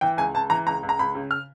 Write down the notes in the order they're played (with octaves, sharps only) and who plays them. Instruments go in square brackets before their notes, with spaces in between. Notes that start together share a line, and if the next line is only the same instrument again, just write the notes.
[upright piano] E3 G5
C#2 G#5
C#2 A5
E3 A#5
C#2 A#5
C#2
A#5
C#2 B5
C#3
F6